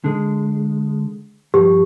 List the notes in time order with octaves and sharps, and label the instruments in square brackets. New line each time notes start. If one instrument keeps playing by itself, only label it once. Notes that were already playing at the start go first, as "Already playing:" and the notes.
[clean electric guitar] D3 G#3
[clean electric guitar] G2 F3 [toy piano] G4